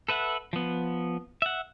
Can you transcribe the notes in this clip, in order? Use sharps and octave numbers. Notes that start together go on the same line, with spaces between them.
A4 B4 E5 F#5
F3 B3
E5 F#5